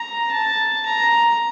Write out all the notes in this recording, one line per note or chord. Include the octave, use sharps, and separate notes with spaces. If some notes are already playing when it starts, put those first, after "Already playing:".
Already playing: A#5
A5
A#5